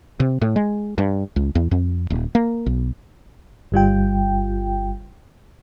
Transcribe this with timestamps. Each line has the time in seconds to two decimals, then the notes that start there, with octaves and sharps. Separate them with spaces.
0.20 C3
0.41 A2
0.56 G#3
0.98 G2
1.36 C#2
1.55 E2
1.71 F2
2.10 D#1
2.35 A#3
2.66 B1
3.72 G1 G3 F4 G5